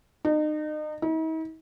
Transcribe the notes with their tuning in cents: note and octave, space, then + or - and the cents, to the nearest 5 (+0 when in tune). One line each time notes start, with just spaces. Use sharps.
D#4 -35
D#4 +45